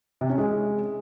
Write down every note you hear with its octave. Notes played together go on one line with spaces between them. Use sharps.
C3
C#4
G#3